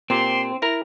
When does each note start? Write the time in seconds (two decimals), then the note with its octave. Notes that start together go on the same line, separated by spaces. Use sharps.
0.10 A#2 C4 G4 C6
0.62 E4 A#4 A#6